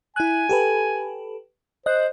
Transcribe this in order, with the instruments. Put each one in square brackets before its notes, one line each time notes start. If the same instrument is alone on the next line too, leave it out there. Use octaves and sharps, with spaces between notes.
[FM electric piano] E4 F#6 [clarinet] G#5
[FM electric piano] G4 A4 B4
[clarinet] C5 [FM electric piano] D#5 F#6